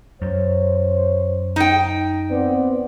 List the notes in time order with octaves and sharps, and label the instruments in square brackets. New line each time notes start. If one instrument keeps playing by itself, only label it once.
[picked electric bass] F#2 [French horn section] C5 C#5
[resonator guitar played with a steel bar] D#4 G5
[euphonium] B3 [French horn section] C4 D5